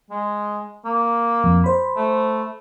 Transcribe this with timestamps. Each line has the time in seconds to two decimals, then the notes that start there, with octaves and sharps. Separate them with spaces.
0.10 G#3
0.85 A#3
1.43 F2
1.64 C5 B5
1.96 A3